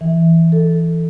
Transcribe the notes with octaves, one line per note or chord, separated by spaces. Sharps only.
E3
A4